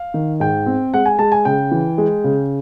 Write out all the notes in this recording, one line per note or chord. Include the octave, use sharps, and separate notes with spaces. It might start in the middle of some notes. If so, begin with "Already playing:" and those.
Already playing: F5
D#3
G#2 G5
C4
G#3 F#5
G#5
G#3 A5
G#5
C#3 G5
E3
G#3
C#3